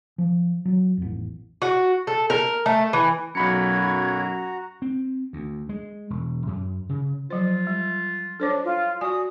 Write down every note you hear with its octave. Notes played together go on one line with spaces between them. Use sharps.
F3
F#3
A1 F2
F#4
A4
A#4
A3
E3
B1 F#2 F#4 A#5 B5 G#6 C#7
C4
D2
G#3
E1
F#2
C#3
F3 F#3 F4 C5
G3
D4 A4 C5 C#5
F4
F#4 D5 G#5 D#6